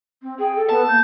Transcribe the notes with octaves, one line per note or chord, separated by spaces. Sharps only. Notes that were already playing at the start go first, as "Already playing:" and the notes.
C4
G#4 G5
A4
B3 A5
A#3 G6